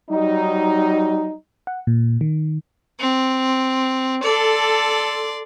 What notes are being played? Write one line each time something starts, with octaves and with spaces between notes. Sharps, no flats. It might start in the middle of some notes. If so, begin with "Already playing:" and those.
F#3 G3 D#4
F#5
A#2
D#3
C4
A4 D5 C6